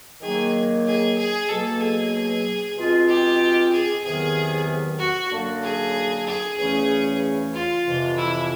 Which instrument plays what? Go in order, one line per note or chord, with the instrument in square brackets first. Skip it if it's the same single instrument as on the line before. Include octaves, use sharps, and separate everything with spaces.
[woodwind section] D#3 F#3 A#3 [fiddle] G#4
[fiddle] G#4
G#4
[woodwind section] B2 F#3 A#3 [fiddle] A4
[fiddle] G#4
[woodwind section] B2 G#3 C4 F4
[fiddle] G4
G#4
[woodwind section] E2 C3 D#3 F#3 B3 [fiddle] G#4
[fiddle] F#4
[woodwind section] F#2 D3 F#3 A#3 D4
[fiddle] G#4
G#4
[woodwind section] E2 C#3 E3 A3 C#4 [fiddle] G#4
[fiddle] F4
[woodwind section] F2 C3 E3
[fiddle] E4